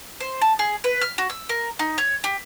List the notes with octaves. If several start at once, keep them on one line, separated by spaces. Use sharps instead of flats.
C5
A5
G#4
B4
F6
F#4
E6
A#4
D#4
C#5
G4